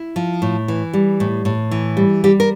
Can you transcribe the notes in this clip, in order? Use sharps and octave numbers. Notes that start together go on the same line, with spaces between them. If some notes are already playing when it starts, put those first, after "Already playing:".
Already playing: E4
F3
A2
E3
G3
A2
A2
E3
G3
G3 G4
A#4